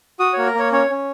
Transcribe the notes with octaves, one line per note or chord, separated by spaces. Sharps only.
F#4 D#6
A#3 C#5
A#4
A#3 C#5
C#4 C#5
C#4